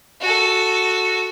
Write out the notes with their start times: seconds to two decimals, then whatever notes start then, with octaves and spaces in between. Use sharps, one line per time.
0.21 F#4 A4